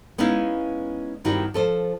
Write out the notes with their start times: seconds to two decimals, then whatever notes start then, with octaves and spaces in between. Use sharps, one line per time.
0.18 G#3 B3 C#4 D#4 E4 F5
1.25 G2 D#3 C4 E4 F#4 G4
1.54 F3 A4 C5